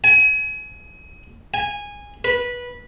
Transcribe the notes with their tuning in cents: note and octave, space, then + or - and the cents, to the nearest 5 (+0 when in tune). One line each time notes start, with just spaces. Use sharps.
G#5 +35
G#5 -15
B4 -15